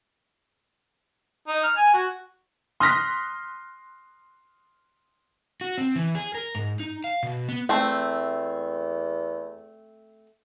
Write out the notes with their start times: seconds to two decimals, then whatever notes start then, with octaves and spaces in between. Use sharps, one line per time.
1.48 D#4
1.64 F6
1.77 G#5
1.94 F#4
2.80 C6 D#6 F6 F#6 A#6 B6
5.61 F#4
5.77 C4
5.96 E3
6.15 G#4
6.34 A#4
6.55 G#2
6.80 D#4
7.04 F5
7.23 B2
7.49 B3
7.69 E2 A3 C4